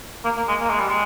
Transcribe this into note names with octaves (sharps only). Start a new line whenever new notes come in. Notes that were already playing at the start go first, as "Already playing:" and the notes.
A#3
A#3
G#3
A#3
G#3
G3
G#3